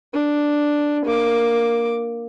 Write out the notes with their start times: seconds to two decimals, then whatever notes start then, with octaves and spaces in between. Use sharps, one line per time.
0.13 D4
1.05 A#3 D6